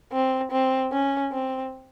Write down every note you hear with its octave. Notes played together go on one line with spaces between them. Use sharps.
C4
C4
C#4
C4